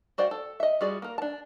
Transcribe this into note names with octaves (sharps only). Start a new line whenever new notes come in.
F#4 C5 D5 F5 G5
A4
D#5 E5
G3 F4 F#4 G#4 D5
A#3 A#4
D4 A5